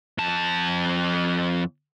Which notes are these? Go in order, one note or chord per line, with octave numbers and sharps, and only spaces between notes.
F2 A5